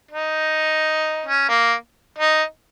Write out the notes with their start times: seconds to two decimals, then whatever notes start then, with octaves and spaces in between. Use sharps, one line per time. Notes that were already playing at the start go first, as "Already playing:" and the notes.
0.11 D#4
1.26 C#4
1.49 A#3
2.18 D#4